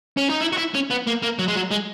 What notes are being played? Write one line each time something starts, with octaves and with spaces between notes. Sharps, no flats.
C#4
D#4
E4
F#4
E4
C#4
B3
A#3
A#3
F#3
G#3
F#3
G#3